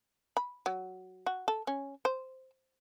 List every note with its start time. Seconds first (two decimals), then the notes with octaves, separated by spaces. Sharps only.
0.37 B5
0.66 F#3
1.26 F#4
1.48 A4
1.67 C#4
2.05 C5